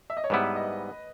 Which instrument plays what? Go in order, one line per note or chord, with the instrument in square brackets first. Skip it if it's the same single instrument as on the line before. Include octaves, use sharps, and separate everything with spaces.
[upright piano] E5
D#5
C#5
[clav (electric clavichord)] G#2 G3 B3 E4 [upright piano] B4
[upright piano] D#5